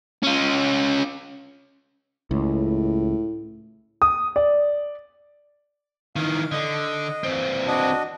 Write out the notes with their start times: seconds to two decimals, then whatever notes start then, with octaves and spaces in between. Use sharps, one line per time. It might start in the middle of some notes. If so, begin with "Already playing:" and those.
0.23 C#4 F4
2.31 C#2 A2
4.02 D#6
4.36 D5
6.16 D#3 E3 F5
6.52 D3 D#5
7.23 E3 C4
7.67 D4 F#4 D#5